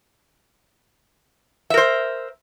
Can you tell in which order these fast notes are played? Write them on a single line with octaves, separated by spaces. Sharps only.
E5 A#4 C5